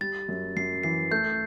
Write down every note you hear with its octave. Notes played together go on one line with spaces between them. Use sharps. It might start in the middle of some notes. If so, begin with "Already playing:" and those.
G3 A6
F#2
F#2 C7
E3 C7
A3 G6